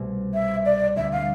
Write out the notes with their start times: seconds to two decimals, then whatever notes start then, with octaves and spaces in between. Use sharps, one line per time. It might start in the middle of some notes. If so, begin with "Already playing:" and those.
Already playing: C2 B2 A3
0.34 E5
0.65 D5
0.96 D2 D3 G3 E5
1.12 F5